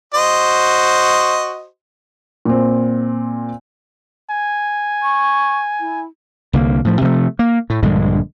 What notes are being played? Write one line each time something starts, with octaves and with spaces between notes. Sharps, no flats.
F#4 C5 D#5
A#2 C4
G#5
C#6
E4
C2 D3 A#3
A2 F3
C3 F3 F#3 A3
A#3
A2
A#1 G2 D3 G#3